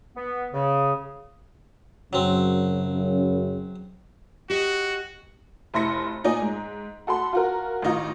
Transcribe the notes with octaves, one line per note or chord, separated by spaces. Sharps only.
B3
C#3
F#2 C#3 F#3 C4
F#4 G4 D#5
F1 E4 C6 A#6 C#7
A#2 D#4 C#5 D5 G#5
G#2
F#4 A4 B5 C6
F4 F#4 A#4
A1 D#3 D#4 F4